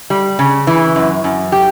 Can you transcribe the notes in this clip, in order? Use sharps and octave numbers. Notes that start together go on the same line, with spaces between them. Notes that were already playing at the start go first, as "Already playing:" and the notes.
G3
C#3
E3
F#2
F#2
G4